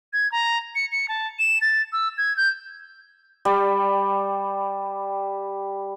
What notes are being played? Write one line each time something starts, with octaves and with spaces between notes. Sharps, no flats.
G#6
A#5
C#7
C#7
A5
E7
A6
E6
G#6
G6
G3 D5 G5